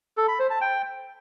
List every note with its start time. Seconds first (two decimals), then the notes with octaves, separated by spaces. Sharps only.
0.17 A4
0.28 B5
0.39 C5
0.50 A5
0.61 G5